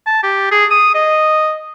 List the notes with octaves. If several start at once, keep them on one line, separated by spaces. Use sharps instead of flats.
A5
G4
G#4
D#6
D#5